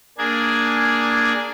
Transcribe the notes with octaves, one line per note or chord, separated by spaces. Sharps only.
A#3 D4 G#4 G#5